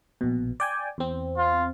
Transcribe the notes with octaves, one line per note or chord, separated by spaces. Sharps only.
A#1 B2
D5 G5 G#5
E2 C4
F4